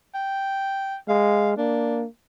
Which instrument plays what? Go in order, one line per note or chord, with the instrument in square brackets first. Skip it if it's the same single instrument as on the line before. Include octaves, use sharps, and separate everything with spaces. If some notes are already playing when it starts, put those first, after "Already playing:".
[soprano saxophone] G5
[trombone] G#3 [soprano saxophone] F5
[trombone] A#3 [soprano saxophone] D4